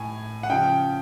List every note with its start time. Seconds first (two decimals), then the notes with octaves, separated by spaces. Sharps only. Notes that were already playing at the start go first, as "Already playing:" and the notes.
Already playing: A2 G#5
0.43 F#5
0.50 C#3 F3 G5